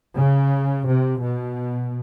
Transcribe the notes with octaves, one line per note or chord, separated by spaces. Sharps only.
C#3
C3
B2